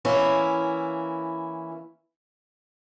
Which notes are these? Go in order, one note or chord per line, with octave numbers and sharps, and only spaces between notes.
E3 A#3 C#4 E4